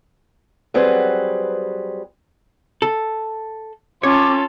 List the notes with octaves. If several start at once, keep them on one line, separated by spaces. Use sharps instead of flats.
F#3 G3 C4 G#4 B4 C5
A4
C#4 F4 A4 C#5 D6